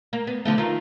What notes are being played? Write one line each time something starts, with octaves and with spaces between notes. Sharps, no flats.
A#3
B3
D3 F3 A3
D#3 F4